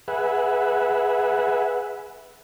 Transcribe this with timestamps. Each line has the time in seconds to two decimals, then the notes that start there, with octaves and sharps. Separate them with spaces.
0.08 G#4 B4 E5 F#5